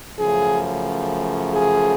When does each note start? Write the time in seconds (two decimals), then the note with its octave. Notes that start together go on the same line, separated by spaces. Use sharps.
0.17 F#2 C#3 F3 A3 G#4
1.53 G#4